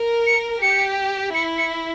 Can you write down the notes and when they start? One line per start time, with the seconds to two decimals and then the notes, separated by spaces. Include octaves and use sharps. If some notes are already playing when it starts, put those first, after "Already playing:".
Already playing: A#4
0.27 C#7
0.62 G4 C#7
1.34 E4 C#7
1.58 C#7